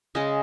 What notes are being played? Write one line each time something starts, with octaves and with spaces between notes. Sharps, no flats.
C#3 G#3 C#4 D#5